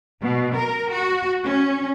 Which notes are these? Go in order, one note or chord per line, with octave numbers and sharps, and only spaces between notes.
B2
A#4
F#4
C#4